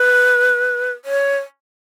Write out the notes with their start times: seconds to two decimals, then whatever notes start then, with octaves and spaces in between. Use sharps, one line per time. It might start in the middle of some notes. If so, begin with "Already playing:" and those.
Already playing: B4
1.05 C#5